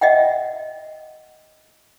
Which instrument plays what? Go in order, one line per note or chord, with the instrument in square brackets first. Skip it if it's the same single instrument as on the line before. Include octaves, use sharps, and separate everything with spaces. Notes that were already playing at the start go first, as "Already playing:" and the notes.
[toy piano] D#5 E5 F#5 G5